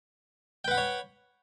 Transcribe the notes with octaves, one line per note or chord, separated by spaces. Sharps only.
B4 C#5 F#5 G5 B5